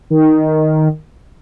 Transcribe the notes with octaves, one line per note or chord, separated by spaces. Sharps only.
D#3